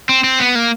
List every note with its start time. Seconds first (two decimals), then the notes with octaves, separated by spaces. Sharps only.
0.09 C4
0.24 C4
0.40 B3
0.55 A#3